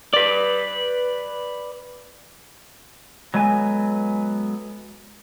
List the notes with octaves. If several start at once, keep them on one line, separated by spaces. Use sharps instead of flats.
B4 D5
F#3 G#3 B3 A4 G#5